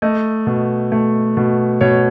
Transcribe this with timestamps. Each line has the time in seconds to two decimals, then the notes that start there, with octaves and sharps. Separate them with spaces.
0.02 A3 D#5
0.47 B2
0.92 A3
1.37 B2
1.81 B2 C#5